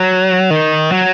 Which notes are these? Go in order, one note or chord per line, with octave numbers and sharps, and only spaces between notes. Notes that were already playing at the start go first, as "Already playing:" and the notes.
Already playing: F#3
D#3
F#3